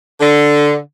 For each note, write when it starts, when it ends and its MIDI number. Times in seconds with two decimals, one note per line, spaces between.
0.21 0.76 50